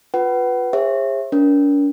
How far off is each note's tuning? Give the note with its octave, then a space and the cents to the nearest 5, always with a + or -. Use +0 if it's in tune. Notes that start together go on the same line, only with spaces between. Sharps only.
F4 +25 B4 +0 F#5 +35
G#4 -35 C#5 -45 E5 +5
D4 -45 A#4 +25